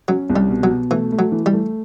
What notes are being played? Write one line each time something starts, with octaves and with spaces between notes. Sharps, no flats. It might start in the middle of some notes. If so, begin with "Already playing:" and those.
F#3 C#4
C2
G3
B2
F#3
B2
E3 A3
A3
F#3
E3
G3
A3